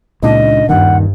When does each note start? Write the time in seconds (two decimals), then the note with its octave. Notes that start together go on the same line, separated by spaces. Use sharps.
0.23 C#2 A#2 D4 D#4 D#5
0.69 D#1 G2 D#3 F#5